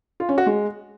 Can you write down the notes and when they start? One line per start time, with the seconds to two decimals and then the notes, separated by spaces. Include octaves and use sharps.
0.20 F4
0.29 C#4
0.38 F#4
0.47 G#3